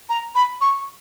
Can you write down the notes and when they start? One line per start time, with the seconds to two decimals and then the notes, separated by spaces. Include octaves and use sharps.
0.09 A#5
0.35 B5
0.61 C#6